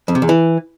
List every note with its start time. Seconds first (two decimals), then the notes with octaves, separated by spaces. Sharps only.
0.08 F2
0.15 C3
0.22 E2
0.29 E3